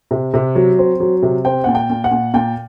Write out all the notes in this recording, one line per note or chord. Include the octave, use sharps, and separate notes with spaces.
C3
C3
F#3
C4
F#3
C3
C4 G5
A#2 F#5
G5
A#2
F#5
A#2
A#2 G5